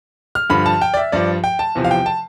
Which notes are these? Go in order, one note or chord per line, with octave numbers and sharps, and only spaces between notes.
F6
G2 D3 F3 B5
A5
G5
D5
E5
G2 F3 D5
G5
A5
E2 C3 F3
F5
G5
A5